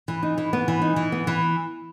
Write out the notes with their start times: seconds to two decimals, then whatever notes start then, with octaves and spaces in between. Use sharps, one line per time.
0.08 E3
0.23 D#4
0.38 E3
0.53 B3
0.68 E3
0.82 D#4
0.96 E3
1.12 B3
1.27 E3